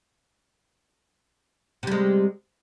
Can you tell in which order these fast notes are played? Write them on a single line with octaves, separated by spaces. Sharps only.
C3 G3 G#3